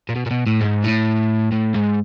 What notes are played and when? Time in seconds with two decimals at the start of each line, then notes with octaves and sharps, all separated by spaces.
0.09 A#2
0.16 B2
0.26 A#2
0.31 B2
0.47 A2
0.61 G#2
0.84 A2
1.52 A2
1.75 G#2